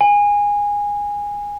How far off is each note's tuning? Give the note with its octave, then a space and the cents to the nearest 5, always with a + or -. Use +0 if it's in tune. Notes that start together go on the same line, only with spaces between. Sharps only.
G#5 -20